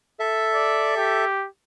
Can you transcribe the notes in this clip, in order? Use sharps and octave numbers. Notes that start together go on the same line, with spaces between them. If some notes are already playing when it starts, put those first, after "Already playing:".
A4 E5
D5
G4